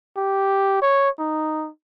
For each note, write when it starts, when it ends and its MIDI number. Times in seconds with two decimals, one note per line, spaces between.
0.17 0.79 67
0.82 1.09 73
1.19 1.69 63